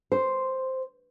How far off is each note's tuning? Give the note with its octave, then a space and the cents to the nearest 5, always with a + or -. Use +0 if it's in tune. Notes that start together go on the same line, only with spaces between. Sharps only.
C5 +0